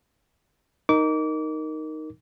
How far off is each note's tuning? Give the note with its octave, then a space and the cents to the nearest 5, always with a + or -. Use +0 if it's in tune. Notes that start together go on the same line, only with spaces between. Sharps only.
D#4 +0 A#4 +0 D6 -30